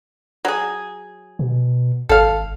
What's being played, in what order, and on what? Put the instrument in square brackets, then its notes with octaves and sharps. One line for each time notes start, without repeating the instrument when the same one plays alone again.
[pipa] F#3 G#4
[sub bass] B2
[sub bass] G#1 [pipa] A4 F5